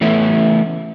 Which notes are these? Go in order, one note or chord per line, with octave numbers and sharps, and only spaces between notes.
E3 A3 B3 C#4 E4